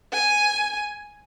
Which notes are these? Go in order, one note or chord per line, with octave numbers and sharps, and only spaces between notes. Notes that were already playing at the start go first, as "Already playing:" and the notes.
G#5